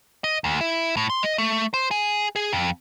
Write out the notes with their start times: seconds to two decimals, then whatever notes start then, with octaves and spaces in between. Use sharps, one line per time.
0.24 D#5
0.44 D2
0.61 E4
0.97 A2
1.10 C6
1.23 D#5
1.38 A3
1.74 C5
1.91 G#4
2.36 G#4
2.53 F2